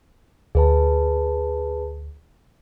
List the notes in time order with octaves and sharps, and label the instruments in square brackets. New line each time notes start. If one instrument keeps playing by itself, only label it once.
[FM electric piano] D2 [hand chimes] G#4 B4 A5